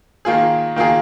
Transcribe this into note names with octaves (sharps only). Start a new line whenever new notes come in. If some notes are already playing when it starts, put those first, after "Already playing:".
D#3 A#3 F4 G#4
D#3 A#3 F4 G#4